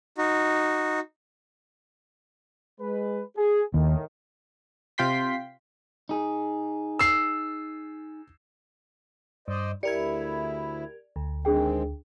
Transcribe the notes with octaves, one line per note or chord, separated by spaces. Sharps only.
D#4 F#4
G#3 B4
G#4
D#2 A2 D#3
C3 F4 G5 C6 B6
D#4 G#4
E6 C7
G2 C5 D5 D#5
D2 E4 G4 A#4 D5 G#6 C#7
D2
D#3 G#3 C4 D4 G#4 G5